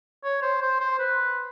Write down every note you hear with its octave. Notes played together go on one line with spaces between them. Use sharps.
C#5
C5
C5
C5
B4